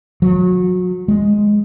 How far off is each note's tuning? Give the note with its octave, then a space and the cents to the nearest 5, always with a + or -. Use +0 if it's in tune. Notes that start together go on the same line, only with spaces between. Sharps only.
F#3 -30
G#3 +0